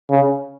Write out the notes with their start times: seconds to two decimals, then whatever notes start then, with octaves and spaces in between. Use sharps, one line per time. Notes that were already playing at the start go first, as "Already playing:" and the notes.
0.10 C#3